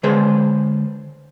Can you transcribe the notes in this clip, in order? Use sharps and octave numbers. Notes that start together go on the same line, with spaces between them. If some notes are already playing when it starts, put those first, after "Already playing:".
D3 G#3 G#4 B4 C5